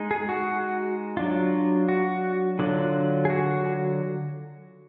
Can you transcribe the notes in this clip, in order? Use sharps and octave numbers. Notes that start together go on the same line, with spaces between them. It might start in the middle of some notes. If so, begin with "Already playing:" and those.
Already playing: G#3 D#4
G#4
F#4
F#3 D4 F4
F#4
D3 F#3 D4 F4
G#4
F#4